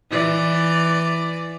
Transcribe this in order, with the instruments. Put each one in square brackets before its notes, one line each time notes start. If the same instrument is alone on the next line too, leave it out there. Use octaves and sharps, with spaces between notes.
[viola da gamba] E3 D5